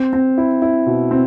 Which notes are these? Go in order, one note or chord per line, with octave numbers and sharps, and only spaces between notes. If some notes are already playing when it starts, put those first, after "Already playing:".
Already playing: C4
C4
E4
E4
B2
C4